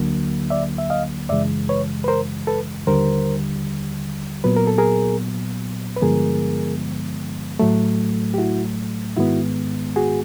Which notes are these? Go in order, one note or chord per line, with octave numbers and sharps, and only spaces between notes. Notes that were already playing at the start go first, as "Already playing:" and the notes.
Already playing: D2 D3 F#3 A#3
D5 E5
E5
D#5 F5
F#2 C#3 E3 G#3 D5 E5
B4 C#5
B4
A#4 C5
A4 B4
D#2 D3 G3 A#4 C5
A#2 F#3 B3 B4
A#4
A4
G#4 A#4
B4
G2 D3 F3 G#3 B3 G#4 A#4
A2 F#3 A3
G4
E4 F#4
G#2 D#3 G#3 B3 E4 F#4
F#4 G#4